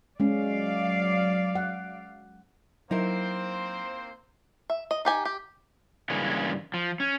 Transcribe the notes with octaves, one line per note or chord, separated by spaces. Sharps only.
F#3 G#3 C#4 D5 F5
F#5
F#3 A#3 C4 D#4 E4 A#4 C5
E5
D#5
D#4 G4 G#5
G4
G2 C#3 E3 G#3 A#3 C#4
F3
C#4